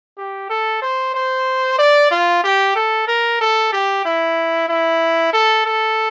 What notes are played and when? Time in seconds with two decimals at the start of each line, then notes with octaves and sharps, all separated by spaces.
0.18 G4
0.50 A4
0.82 C5
1.14 C5
1.79 D5
2.11 F4
2.44 G4
2.76 A4
3.08 A#4
3.41 A4
3.73 G4
4.05 E4
4.69 E4
5.33 A4
5.66 A4